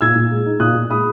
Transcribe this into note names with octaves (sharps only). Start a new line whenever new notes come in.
A#2 E6 G#6
A#2
G#3
D#4
A#2 D#6 F#6
A#2
G#3 B5 D#6